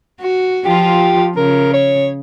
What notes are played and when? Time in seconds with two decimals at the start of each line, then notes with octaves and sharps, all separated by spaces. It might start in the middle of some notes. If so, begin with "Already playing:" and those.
0.20 F#4
0.66 F3 F4 G4
1.37 C#3 A#4
1.74 C#5